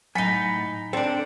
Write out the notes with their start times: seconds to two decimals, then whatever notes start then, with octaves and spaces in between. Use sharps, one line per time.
0.15 A2 F#3 D#4 F#5 G#5 B5
0.93 C4 D4 A4 D5